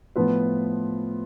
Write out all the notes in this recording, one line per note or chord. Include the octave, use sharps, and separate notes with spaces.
A2 F3 B3 F4 B4